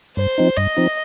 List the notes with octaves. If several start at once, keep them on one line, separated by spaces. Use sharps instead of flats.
G2 C5
F3 C4 D#4
G2 D#5
F3 C4 D#4